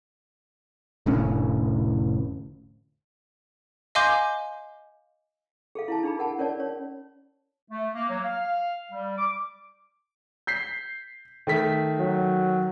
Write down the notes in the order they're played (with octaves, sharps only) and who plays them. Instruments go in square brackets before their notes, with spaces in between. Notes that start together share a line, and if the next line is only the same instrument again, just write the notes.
[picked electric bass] F1 A2 D3 C#4
[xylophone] D#5 F5 G#5 C6 D6 G6
[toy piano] G#4 A4 F5
E4 F5 A5
D4 D#4 G#4 A5 B5
A#4 F#5 A5
C#4 A#4 C#5 D5 A5
C#5
[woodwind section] A3
A#3
F#3
F5
G3
D6
[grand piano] G6 B6 C7
D#3 A3 B6
[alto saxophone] F#3